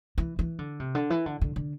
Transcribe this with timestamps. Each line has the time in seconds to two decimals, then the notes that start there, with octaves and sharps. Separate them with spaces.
0.18 E3
0.39 E3
0.59 D3
0.80 C3
0.95 D3
1.10 E3
1.26 D3
1.41 D3
1.56 D3